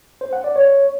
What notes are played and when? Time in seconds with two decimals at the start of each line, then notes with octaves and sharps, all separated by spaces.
0.21 C5
0.33 F#5
0.44 D5
0.56 C#5